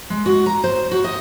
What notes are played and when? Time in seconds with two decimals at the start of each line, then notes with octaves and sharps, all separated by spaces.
0.10 G#3
0.26 F#4
0.46 A#5
0.64 C5
0.91 F#4
1.04 D#5